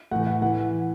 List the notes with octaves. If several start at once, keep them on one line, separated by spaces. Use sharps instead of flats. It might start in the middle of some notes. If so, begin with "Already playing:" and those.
A2 E3 F#5
F#5
E3 F#5